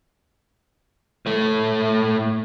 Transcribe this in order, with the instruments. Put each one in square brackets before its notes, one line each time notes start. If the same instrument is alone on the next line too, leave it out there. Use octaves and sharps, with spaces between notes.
[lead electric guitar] A2 A3